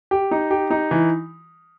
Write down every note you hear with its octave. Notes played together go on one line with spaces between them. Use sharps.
G4
D#4
G4
D#4
E3